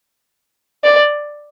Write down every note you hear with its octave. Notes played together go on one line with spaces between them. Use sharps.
D5